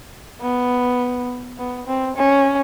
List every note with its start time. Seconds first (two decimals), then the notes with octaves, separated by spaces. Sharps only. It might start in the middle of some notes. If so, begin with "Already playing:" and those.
0.41 B3
1.58 B3
1.87 C4
2.16 C#4